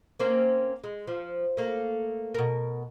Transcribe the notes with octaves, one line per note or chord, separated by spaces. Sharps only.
A#3 C4 C#4
G#3
F3
A3 A#3
B2 A#4